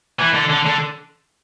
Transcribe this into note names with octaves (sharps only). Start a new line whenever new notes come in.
E3
D3
D3
D3